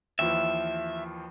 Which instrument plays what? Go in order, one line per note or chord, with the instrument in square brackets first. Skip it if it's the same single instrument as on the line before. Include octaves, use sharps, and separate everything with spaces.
[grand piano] D#2 E3 F3 [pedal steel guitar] E5